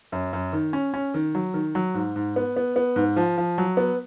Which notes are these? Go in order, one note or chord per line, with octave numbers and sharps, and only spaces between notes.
F#2
F#2
D#3
C#4
C#4
D#3
F#3
D#3
F#3
G#2
G#2
B3
B3
B3
G#2
F3
F3
F#3
B3